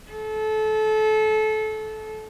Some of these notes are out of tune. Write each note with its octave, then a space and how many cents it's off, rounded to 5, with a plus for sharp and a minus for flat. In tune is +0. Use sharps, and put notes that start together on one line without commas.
A4 -25